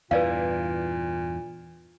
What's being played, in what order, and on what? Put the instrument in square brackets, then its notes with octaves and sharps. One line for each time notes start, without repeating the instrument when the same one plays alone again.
[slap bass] E2 G2 E3 [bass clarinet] A#2 [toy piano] B4 D5 F5